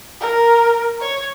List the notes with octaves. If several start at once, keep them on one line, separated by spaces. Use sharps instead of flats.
A#4
C#5